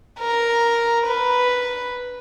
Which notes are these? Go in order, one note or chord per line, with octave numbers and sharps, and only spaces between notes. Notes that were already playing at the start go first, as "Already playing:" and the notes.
A#4
B4